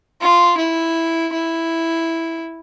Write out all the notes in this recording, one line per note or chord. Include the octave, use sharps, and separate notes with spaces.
F4
E4
E4